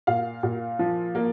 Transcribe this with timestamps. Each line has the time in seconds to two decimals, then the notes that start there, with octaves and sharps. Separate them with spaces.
0.07 A#2 F5
0.43 A#2
0.79 F3
1.15 A#3